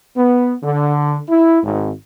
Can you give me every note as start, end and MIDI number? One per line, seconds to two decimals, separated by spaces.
0.16 0.54 59
0.63 1.18 50
1.29 1.62 64
1.63 1.90 32